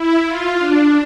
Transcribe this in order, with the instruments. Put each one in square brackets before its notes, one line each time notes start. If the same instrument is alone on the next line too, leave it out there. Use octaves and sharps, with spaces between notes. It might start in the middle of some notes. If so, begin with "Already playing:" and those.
Already playing: [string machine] E4
F4
D4